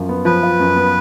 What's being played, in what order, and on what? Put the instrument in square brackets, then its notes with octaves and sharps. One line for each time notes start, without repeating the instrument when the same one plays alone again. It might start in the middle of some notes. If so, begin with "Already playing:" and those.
Already playing: [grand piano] F#2 F3 F4
B3
[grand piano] F3 [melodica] B4
[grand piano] F4
F#2
B3